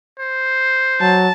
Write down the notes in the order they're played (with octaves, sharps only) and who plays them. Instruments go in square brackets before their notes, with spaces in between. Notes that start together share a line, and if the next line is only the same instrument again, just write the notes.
[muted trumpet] C5
[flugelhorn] F#3 [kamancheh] A5